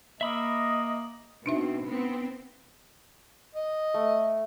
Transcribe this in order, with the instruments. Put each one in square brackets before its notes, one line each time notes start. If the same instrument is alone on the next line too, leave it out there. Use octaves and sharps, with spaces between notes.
[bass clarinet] A#3 [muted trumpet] D#5 [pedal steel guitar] E5 B5 E6
[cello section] B2 C4 [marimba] D4 D#4 E5
[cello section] B3 C4
[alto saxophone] D#5
[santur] A3